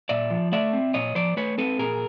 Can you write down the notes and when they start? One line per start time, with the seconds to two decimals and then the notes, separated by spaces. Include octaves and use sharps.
0.09 A#2 D5 E5
0.30 F3
0.52 A3 D5 E5
0.73 C4
0.94 A#2 C#5 D#5
1.15 F3 C5 D5
1.37 A3 B4 C#5
1.58 C4 A4 B4
1.79 A#2 G#4 A#4